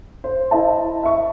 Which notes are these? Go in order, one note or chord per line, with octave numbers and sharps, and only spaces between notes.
C5
E4 C5 D#5 A5
E5 C#6